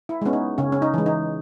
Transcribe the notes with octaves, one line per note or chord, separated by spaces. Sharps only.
E4
G#3 B3 C#4
D#4
C#3 C#4
C#4
D#4
E3 G#3
D#4